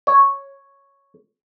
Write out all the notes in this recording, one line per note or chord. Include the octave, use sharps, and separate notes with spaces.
C#5